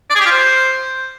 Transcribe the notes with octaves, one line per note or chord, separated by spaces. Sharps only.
D5
G#4
G4
F4
C5